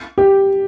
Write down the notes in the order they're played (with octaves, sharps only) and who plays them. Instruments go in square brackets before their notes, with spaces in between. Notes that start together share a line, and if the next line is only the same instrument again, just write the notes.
[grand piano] G4